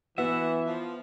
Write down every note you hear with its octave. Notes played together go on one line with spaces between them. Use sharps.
E3 B3 F#4 B4 E5 F#5
F3